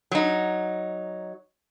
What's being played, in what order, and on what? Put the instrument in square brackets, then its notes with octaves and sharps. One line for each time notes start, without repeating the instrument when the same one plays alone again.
[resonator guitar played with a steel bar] F#3 D#4